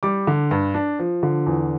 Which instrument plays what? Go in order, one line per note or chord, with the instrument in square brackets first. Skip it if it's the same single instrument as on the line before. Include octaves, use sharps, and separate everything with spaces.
[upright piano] G3 D6
D3
G2
D4
F3
D3
E2